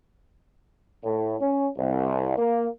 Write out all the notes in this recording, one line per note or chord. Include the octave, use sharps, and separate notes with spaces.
A2
C#4
C2
A#3